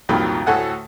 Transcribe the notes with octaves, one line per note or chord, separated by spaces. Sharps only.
C2 F2 A#2 D#3 F#3 B5
D2 A2 F#4 A4 F#5 G#5